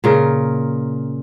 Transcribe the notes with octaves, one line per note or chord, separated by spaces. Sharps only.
A#2 C#3 A#4